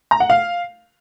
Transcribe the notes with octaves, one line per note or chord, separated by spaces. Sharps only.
A#5
F#5
F5